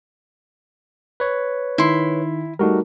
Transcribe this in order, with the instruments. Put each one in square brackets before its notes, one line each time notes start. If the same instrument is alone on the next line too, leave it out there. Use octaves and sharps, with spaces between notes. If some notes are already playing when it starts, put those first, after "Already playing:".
[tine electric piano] B4 C#5
[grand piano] D#3 [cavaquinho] E4 C6
[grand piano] G3 A3 [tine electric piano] D#4 F#4 A#4